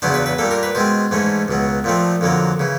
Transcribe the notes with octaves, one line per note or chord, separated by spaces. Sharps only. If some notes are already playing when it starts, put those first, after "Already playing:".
E2 C#3 F#3 B3 D4 C5
B4
B4
A#2 G3 A#3 A4
A#4
B4
B2 G#3 C4 C5
G#2 E3 A3 C#4
C#2 B2 F#3
A#2 F3 A3 C4
F2 D3 F#3 A#3
C#3 E3